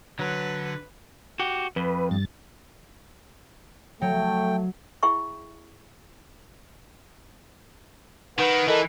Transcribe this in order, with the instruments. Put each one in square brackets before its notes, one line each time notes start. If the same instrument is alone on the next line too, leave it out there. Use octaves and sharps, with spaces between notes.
[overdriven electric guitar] D3 [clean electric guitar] F#3 [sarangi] B4
[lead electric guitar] F#4 G4
[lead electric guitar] F2 [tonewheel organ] B4
[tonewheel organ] G2 A6
[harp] F#3 [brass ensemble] A3 [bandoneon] G5
[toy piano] E4 G#4 E5 G5 B5 C#6
[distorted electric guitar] D#3 [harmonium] B4 F#5
[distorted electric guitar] E3 [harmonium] A4 A#4 D#5